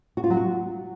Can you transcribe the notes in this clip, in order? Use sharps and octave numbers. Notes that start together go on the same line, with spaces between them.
F#4
F4
F#3
F#4